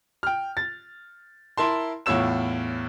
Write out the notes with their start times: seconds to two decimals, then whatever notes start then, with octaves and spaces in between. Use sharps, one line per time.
0.23 G5 F6
0.57 A6
1.58 E4 A#4 A5 C6
2.06 E2 A2 F4 C#5 E6 E7